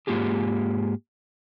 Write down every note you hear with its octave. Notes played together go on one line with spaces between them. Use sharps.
G#2 B2 A#3 F4 G4 G#4